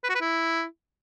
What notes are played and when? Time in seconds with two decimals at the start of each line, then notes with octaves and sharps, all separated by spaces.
0.04 B4
0.09 F#4
0.15 B4
0.21 E4